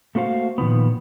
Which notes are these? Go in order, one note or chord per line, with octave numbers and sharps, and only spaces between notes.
A3 A#3 F#4 C5 F5
A#2 D#3 F3 B3